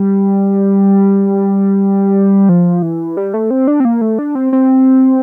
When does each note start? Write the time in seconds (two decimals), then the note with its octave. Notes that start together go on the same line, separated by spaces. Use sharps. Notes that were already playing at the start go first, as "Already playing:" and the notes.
Already playing: G3
2.49 F3
2.82 E3
3.17 G3
3.34 A3
3.50 C4
3.67 D4
3.80 C4
3.85 A#3
4.01 A3
4.19 D4
4.35 C4
4.53 C4